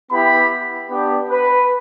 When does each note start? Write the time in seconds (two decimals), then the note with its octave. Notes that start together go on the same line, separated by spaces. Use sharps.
0.12 B3 E4 G4 B5
0.90 B3 D4 G4
1.30 B4